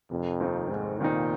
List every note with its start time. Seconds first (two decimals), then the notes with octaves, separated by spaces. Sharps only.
0.11 F1 F2
0.40 D#2 D#3 C4 D#4
0.70 F1 G#2
1.00 D#2 A#2 D#3 C4 D#4